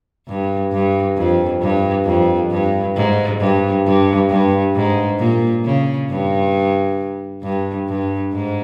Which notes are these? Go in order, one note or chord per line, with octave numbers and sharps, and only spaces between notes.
G2
G2
F2
G2
F2
G2
G#2
G2
G2
G2
G#2
A#2
C#3
G2
G2
G2
G#2